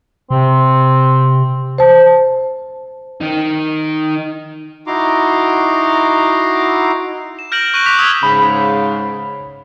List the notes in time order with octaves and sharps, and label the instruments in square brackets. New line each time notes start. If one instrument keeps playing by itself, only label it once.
[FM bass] C3 [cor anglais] C4
[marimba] C5 A5
[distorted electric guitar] D#3 D#4
[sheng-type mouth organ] D#4 E4 F#4 A#5 C6 D6
[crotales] E7
F6 G6 A#6 D7 E7 F#7
C#6 F#6 A#6 D#7 F#7
C#6 D6 F#6 B6 F7
D#6 E6 G#6 B6 E7 F7
[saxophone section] G#2 C#3 [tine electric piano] B5